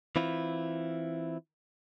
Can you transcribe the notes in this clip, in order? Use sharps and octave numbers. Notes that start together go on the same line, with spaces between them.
E3 C4 E4 F4